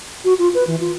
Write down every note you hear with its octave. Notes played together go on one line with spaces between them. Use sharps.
F#4
F4
B4
E3
F4